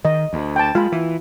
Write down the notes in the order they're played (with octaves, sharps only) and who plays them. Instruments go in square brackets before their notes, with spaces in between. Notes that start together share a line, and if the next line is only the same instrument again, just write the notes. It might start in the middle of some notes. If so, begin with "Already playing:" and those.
[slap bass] D#3 [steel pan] D#5
[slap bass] D2
[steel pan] G5 A5
[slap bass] G#3 [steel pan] F4 B5
[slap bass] E3